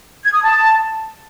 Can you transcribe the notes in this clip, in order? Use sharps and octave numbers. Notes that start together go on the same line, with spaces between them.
G#6
D#6
A5